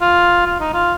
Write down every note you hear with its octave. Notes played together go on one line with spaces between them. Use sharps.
F4
F4
D#4
F4